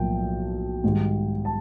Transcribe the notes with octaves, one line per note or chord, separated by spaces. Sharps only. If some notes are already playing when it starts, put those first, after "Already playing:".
Already playing: B1 A2 F3 A#3 G5
G#2 D#3 G3
A5